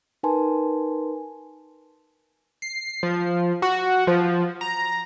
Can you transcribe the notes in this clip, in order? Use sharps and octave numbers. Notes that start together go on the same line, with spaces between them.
D#4 A#4 B4 G#5 A5 C6
C7
F3
F#4
F3
A#5